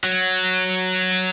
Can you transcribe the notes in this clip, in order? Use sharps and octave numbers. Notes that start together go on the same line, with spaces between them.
F#3